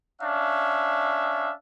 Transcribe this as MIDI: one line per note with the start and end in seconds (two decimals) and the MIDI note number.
0.22 1.53 61
0.22 1.53 62
0.22 1.53 76
0.22 1.53 77